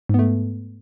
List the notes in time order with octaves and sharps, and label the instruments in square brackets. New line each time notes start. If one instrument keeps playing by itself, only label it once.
[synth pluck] G#2
B3
A3